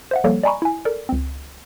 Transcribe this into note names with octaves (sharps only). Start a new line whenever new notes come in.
C5 E5 F#5
F3 G3 A#3 A4 C#5
D5 D#5 G#5 A#5 B5 C#6
E4 G#5
A4 A#4 D5
C#2 C4